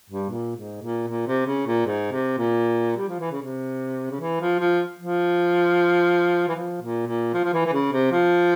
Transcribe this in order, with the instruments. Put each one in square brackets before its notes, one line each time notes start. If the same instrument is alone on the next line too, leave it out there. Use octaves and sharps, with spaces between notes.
[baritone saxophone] G2
A#2
G#2
A#2
A#2
C3
C#3
A#2
G#2
C3
A#2
G3
F3
E3
C#3
C3
C#3
E3
F3
F3
F3
E3
F3
A#2
A#2
F3
F3
E3
E3
C#3
C3
F3